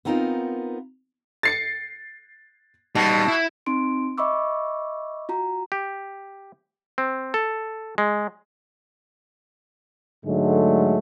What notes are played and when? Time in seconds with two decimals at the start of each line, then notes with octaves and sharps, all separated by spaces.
0.05 B3 C4 D#4 F4 A#4
1.43 A6 C7 C#7
2.95 B2 G3 D#4 A5
3.28 E4
3.66 C4 D#4 C6 D7
4.18 D#5 E5 B5 C#6 D6 E6
5.29 F4 F#4 A#5
5.72 G4
6.98 C4
7.34 A4
7.98 G#3
10.25 G#2 D3 F#3 G#3 A3